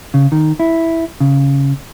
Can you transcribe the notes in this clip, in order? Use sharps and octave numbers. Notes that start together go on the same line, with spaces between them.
C#3
D#3
E4
C#3